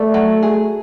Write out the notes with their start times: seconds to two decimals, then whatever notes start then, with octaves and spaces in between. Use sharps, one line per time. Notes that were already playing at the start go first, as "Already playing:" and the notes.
Already playing: A3 D5
0.14 F#3
0.43 G#4